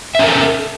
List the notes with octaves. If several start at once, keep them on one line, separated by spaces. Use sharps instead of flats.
C#4 A4 A#4 E5